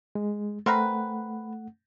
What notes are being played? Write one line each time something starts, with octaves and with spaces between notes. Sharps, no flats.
G#3
A3 C4 A#4 B4 F#5